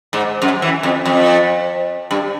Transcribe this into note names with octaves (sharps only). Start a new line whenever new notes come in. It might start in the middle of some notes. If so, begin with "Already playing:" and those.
G#2
F#2
E3
F2
F2
G2